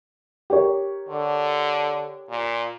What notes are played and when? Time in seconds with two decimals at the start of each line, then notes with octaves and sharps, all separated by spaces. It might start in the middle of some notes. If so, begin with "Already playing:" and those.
0.50 G4 A#4 C#5
1.09 D3
2.30 A#2